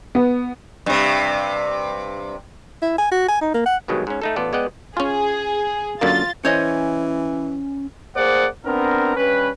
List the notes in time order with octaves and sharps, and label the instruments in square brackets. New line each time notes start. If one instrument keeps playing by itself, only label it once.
[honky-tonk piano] B3
[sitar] G2 C3
[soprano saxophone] E4
G#5
F#4
G#5
D#4
A#3
F#5
[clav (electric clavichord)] G2 B2 D#3 F#3 G#3
G#2 C#4
A3 D#4 A4
A1 B3 F4 A4 D5
G#3 B3 D5 D#5 F#5 G5
[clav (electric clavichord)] C#4 F4 [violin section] G#4
[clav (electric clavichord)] F#2 D3 A#3 [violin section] F4 A6
[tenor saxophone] E3 [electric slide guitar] C#4 G#5 [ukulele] C5 C#5 D#5
[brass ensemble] A#3 G#4 C5 D5 F#5
B3 C4 D4 A#4
G2 C#4 B4